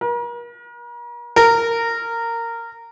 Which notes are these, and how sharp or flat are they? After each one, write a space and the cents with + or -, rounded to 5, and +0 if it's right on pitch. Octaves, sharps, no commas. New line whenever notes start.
A#4 +40
A#4 -15